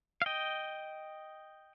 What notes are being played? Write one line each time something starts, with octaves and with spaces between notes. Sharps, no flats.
F5
D#5 G5